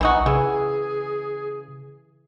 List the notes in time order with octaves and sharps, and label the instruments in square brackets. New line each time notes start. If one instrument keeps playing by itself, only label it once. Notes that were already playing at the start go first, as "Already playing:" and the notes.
[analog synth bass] B1 [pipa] E3 D#4 F#4
[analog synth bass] C#3 [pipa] E3 [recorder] G#4